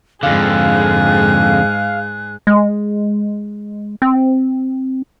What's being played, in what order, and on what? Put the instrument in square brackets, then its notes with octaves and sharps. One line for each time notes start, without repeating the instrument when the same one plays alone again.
[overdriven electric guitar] F2 D3 [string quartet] G#2 G#4 [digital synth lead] F5 [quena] F#6
[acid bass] G#3
C4